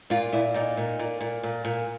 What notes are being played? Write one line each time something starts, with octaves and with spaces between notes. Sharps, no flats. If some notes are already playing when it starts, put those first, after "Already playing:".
A#2 F4
A#2 E4
A#2 D#4
A#2
A#2
A#2
A#2
A#2